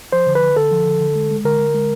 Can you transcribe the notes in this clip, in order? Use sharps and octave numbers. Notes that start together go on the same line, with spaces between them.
F3 C5
D3
B4
D3
D3 A4
F3
D3
D3
G#3
G#3
D3 A#4
D3
G#3